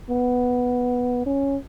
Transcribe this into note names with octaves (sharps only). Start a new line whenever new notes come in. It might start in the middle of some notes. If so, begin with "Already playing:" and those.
B3
C#4